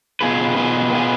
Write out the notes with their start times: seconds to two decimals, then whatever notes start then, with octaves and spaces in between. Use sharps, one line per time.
0.21 B2 B3 F4 G#4 B4
0.56 B2 B3 F4 G#4 B4
0.92 B2 B3 F4 G#4 B4